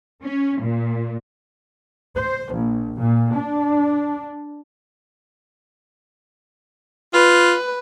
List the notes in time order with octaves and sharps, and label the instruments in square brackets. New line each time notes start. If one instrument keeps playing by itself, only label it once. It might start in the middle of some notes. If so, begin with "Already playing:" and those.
[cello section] C#4
A#2
[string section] C5
A#1
A#2
D4
[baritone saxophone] F4 [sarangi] B4